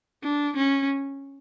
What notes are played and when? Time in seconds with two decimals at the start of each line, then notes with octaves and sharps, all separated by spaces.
0.23 D4
0.56 C#4